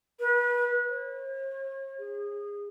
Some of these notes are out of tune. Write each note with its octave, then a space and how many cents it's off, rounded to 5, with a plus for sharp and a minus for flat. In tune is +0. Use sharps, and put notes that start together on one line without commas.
B4 -30
C#5 -45
G#4 -25